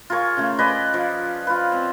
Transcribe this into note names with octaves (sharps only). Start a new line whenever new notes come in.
F4 G#4 A#4 C#5
C#3 A3
G#4 B4 D5 D#5
F3
F4 B4
C4